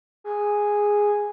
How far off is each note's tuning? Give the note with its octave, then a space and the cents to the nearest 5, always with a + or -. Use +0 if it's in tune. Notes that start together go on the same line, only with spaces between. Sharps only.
G#4 -5